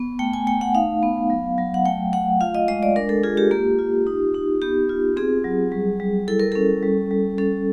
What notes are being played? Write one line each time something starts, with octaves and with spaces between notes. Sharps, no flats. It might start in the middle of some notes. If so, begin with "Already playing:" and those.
Already playing: B3
A3 G5
G#5
A3 G5
F#5
D#4 F5
B3
F#3
F#3
F#5
A3 G5
A3 F#5
F4 F5
D#5
G#3 D#5
D5
D4 A#4
A4
F4 G#4
G4
A#3 G4
F4
D#4
D#4
B3 G4
F4
C4 G#4
F#3
G3
G3
E4 A4
A#4
C#4 A4
G3
G3
C#4 A4